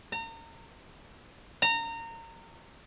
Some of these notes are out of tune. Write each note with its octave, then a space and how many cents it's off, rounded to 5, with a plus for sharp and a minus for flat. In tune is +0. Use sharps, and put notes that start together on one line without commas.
A#5 -35
A#5 -25